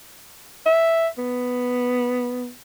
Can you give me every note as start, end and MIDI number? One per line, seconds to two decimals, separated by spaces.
0.66 1.08 76
1.18 2.50 59